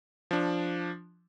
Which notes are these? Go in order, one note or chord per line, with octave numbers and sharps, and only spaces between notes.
F3 D4